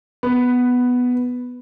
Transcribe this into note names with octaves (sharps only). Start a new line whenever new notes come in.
B3